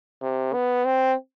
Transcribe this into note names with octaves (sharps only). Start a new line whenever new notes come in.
C3
B3
C4